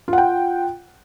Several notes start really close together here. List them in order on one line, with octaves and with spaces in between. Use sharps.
F4 F#5 G5